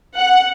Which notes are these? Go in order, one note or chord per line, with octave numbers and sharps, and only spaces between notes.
F#5